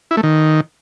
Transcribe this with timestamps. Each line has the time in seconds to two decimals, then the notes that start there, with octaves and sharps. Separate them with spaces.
0.11 E4
0.17 A3
0.23 D#3